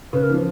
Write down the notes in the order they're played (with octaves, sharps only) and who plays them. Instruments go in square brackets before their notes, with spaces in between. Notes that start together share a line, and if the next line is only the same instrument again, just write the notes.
[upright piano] C#3 [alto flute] B4
[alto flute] A#4
[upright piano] E3
F3